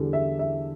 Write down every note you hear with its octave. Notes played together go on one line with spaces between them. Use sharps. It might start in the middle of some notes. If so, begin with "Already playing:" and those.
Already playing: E2 D3 G3
E5
E5